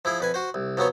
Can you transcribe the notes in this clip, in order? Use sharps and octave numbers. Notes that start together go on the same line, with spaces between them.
F3 E4 G#4
F2 B4 G#5
F#4 C5
C2
F3 F#3 B3 C#5